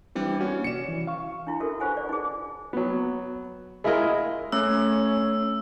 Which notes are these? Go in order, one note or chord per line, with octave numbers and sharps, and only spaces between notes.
E3 G3 C4 D4
A#3 C#4 F#4
C2 D5 C#7 E7
E3
F5 C#6
D4 E4 F4
F#4 A4 A#4 E5
F4 G4 B4 C5 F#5 G#5
D5
D#4 G#4
F#3 B3
G#3 E4 F4 A#4 D#5
A3 C#4 E6